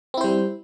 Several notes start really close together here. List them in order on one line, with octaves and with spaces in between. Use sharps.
C4 E4 C5 G3